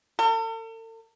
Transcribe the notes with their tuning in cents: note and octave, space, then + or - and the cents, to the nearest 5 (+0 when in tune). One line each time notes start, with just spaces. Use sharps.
A4 +45